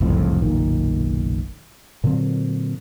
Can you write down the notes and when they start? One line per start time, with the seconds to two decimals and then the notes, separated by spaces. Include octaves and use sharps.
0.01 F#1 C2 F2 A2
0.42 F#1 B1 A#2 D#3
2.04 A#2 D3 F#3 C4